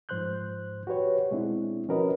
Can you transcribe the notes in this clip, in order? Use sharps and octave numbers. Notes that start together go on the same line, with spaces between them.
G#2 F3 C5 C6 F#6 G6
F#4 G4 B4 C#5
B2 G#3 C4 D4 E4
F3 C#4 F#4 A#4 B4 D#5